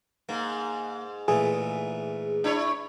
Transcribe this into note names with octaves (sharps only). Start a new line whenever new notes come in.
G#2 A#3
A#2 E3 A3 G#4
D4 E4 C#5